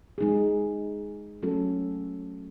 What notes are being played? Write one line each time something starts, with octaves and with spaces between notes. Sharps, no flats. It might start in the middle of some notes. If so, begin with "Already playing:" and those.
G#3 D#4 G#4
F#3 A3 C#4 F#4 A4